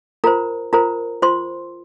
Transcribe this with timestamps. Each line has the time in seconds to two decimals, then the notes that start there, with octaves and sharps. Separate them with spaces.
0.24 F4 A#4 C5 A#5
0.73 F4 A#4 C5 A#5
1.22 F4 C5 C6